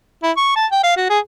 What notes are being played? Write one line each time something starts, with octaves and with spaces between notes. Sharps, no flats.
E4
C#6
A5
G5
F5
F#4
G#4